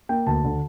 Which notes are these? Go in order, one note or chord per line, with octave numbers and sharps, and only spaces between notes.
A#3 G5
D2 A5
D3